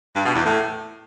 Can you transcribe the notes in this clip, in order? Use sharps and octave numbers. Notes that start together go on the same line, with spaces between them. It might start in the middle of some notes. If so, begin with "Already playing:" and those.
G2
B2
E2
A2